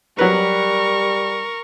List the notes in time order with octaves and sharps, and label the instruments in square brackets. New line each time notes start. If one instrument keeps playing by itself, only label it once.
[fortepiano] F#3 B4 [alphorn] G3 [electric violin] A#4 C#6